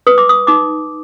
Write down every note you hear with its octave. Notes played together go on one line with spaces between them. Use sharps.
B4 D#6
D6
D#6
D#4 D6